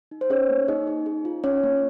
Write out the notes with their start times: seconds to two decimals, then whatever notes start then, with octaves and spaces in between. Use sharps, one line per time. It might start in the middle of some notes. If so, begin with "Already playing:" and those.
0.11 D#4
0.21 C5
0.30 C#4 G#4 C#5
0.50 A#3
0.68 D#4 G#4 D#5
0.87 D#4
1.06 G#4
1.25 F4
1.44 C#4 C#5
1.64 A#3